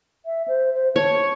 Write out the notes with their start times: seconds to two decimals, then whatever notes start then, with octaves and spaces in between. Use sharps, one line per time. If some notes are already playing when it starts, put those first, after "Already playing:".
0.26 E5
0.48 C5
0.73 C5
0.96 C#5 A5